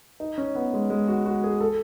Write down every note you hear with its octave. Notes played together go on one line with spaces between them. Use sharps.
D#4
C#4
B3
G#3
G#3
F#4
F#4
G#4
A4